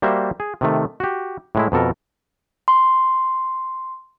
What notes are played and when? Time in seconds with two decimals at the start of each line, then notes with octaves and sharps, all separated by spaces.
0.02 G3 A#3 F#4 C5 E5
0.40 G#4
0.61 C3 D#3 A3
1.00 F#4 G4
1.55 A2 G#3 E4
1.72 F2 B2 A4 A#4
2.68 C6